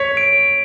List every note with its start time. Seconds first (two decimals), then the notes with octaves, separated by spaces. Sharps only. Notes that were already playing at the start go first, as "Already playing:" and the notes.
Already playing: C#5 B6
0.17 D7